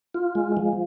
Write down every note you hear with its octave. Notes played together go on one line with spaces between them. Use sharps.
F4
G#3
F3